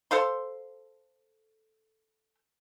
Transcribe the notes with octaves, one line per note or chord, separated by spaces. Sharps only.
A4 C5 F5 C6